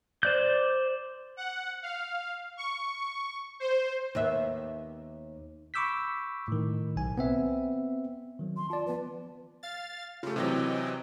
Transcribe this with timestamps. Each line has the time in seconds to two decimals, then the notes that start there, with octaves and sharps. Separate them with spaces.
0.23 C5 D5 G6
1.37 F#5
1.83 F5
2.57 C#6
3.60 C5
4.15 D#2 B3 E5
5.74 B5 C#6 D6 E6 G6 B6
6.48 A2 D#3
6.96 B1 G#5
7.18 B3 C4 E5
8.39 D#3 F#3
8.57 C6
8.70 F4 D5 A5
8.86 F3 B3 B4
9.63 F5 A6
10.23 C#3 A3 F4 G4
10.36 C3 E3 F#3 C4 D#5 G5